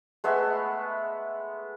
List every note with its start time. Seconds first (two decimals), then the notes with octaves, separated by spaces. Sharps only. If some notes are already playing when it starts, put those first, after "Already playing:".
0.24 G#3 A3 B3 E5